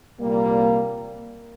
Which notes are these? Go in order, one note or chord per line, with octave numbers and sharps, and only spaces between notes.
C2 A#2 G3 A#3